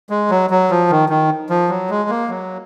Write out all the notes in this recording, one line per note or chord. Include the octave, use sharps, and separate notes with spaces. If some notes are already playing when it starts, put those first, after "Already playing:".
G#3
F#3
F#3
F3
D#3
D#3
F3
F#3
G#3
A#3
F#3